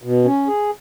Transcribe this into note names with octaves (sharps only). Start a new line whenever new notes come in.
B2
C#4
G#4